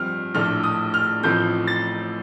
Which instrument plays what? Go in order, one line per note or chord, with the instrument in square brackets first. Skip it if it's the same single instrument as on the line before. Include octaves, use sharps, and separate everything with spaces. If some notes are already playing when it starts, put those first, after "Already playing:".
Already playing: [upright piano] G2 F3 C4 F6
A#1 A2 A3 D4 F6
D#6
F6
A1 A2 F3 A3 C4 G6
A6